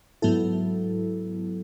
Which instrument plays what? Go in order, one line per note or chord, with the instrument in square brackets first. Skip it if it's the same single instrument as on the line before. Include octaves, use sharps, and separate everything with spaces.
[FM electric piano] G#2 F#3 B3 E4 A4